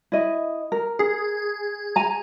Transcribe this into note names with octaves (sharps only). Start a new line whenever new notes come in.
E4 D#5
A#4
G#4
G#5 A#5